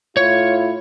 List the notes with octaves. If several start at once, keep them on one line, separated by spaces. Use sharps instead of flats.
A2 E4 F4 C#5